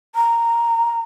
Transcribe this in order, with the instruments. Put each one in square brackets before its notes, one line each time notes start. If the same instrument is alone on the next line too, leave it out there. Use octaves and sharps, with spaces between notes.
[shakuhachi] A#5